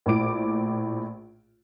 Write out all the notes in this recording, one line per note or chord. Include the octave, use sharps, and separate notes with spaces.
A#1 A2 D6 D7